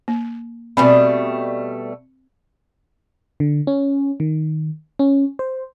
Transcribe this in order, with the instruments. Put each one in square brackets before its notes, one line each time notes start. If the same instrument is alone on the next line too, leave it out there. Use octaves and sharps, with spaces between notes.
[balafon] A#3
[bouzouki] B2 G3 A3 [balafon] C4 G#5 B5
[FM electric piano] D3
C#4
D#3
C#4
C5